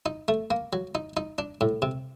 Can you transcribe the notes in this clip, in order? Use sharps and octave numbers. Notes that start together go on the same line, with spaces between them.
D#4
A3
A#3
F#3
D#4
D#4
D4
A2
C3